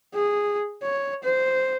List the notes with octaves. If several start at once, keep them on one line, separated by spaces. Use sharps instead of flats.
G#4
C#5
C5